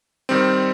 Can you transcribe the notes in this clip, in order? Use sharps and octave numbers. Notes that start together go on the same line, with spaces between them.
D#3 G3 C4